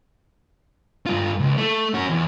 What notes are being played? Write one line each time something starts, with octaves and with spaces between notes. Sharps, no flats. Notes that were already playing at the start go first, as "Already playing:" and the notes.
G2 F4
C#2
A3
C#4 F#4
E2